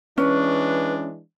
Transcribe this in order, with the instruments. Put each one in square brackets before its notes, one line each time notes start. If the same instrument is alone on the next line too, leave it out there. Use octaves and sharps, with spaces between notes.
[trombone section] E3 G#3 D4 [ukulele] C#4 [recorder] B4